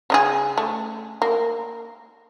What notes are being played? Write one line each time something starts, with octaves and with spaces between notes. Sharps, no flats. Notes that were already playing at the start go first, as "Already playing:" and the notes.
C#3 D#4 G#4
A3
A#3